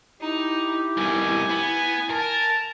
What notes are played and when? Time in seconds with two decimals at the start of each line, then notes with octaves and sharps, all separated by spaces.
0.20 D#4 E4 G4
0.97 C2 B2 G#5
1.50 B3
2.10 A#4 A5